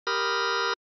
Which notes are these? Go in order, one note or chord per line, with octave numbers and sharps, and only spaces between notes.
G4 A#4 B5 D#6 F6